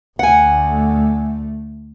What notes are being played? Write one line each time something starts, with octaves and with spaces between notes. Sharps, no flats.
D2 A3 F#5 G#5